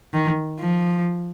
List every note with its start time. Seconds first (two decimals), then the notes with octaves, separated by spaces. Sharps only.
0.13 D#3
0.60 F3